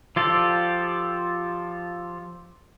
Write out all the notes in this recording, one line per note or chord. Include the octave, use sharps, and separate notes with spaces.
F3 F4 G4 A4 D5